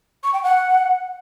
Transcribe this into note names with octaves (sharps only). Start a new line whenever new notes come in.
C#6
G5
F#5